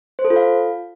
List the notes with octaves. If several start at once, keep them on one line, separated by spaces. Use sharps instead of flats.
C5
A4
F4
F5